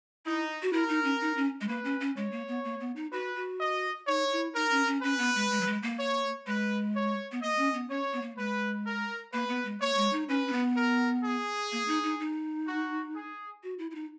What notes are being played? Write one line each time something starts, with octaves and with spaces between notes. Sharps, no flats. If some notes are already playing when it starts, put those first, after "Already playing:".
D#4 E4
F#4
E4 A#4
D#4
C#4
D#4
C#4
G#3
A#3 B4
C#4
C#4
G#3 C#5
A#3
B3
A#3
B3
D#4
F#4 B4
F#4
D#5
D#4 C#5
E4
D#4 A#4
C#4
C#4
C#4 B4
B3
G#3
G#3
F#3
G#3
A#3
C#5
G#3 B4
C#5
B3
A#3 D#5
C#4
B3
C#4 C#5
B3
A#3
G#3 B4
A#4
A#3 B4
B3
G#3
A#3 C#5
G#3
D#4
C#4 B4
C#4
B3
A#4
G#4
A#3
D#4
D#4
D#4
F#4
G#4
F#4
E4
E4
D#4